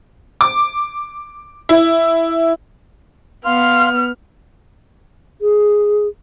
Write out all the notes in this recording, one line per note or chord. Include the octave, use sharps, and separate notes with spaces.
D6
E4
B3 F5 C6 F6
G#4